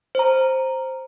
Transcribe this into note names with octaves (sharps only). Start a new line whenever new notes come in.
C5 A#5